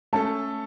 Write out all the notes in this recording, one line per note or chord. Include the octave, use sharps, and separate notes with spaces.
A3 C#4 A4 A5